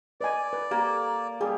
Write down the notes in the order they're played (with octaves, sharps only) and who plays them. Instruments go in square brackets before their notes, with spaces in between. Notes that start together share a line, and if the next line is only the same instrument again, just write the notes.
[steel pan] B4 D#5 G#5 [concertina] D5
[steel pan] B4
[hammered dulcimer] A#3 [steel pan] G4
[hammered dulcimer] G3 [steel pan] G#4